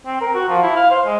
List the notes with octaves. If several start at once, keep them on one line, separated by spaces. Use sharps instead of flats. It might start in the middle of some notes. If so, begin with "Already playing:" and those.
C4
A#4
F#4
F3
E4
F5
C5
G#3